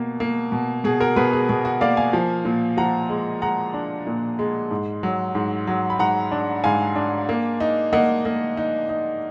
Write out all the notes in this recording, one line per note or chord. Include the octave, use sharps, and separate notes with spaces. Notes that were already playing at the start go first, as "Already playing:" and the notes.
Already playing: B2 A#3
A#3
B2
B2 G#4
F#4 A#4
B2 G#4 B4
G#4
B2 G#4
F#4
A#3 D5 F5
F5 G#5
F3
A#2
F3 F#5 A#5
G#3
G#3 F#5 A#5
D4
A#2
G#3
G#2
F#3
G#2
F#3
B5
G#2 F#5 A#5
D4
G#2 F5 G#5
D4
A#3
D#4
A#3 D#5 F#5
A#3
D#4
D#4